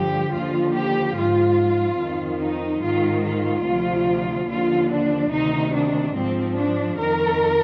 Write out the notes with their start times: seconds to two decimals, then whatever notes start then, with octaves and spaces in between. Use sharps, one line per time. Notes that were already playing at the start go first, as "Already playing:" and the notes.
Already playing: G2 D3 F3 G4
0.32 D#2 D3 F3 F4
0.74 G4
1.15 G#2 F3 F4
1.99 F2 D#3
2.40 D#4
2.82 G#2 D#3 F4
3.23 F4
3.64 D2 C3 F3
4.48 D#2 D3 F3 F4
4.89 D4
5.31 D2 C3 D#3 D#4
5.73 D4
6.14 G#2 F3 C4
6.56 D4
6.97 F2 D#3 A#4